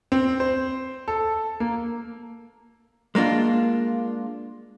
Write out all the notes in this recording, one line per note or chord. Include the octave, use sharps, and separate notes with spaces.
C4
C5
A4
A#3
G#3 A#3 D4 F4